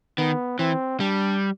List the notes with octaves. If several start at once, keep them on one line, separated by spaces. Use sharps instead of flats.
D#3 B3
E3 C4
G3 D4